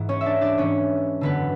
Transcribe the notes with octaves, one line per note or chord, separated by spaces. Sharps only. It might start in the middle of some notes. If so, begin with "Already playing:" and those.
Already playing: G#2 E3
C#4 C#5
E5
D4 D5
D4 D5
G#2 E3 C#4 C#5
F#2 D3 B3 B4